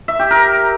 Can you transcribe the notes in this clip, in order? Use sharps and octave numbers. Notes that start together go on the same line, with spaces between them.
E5
G4
A#4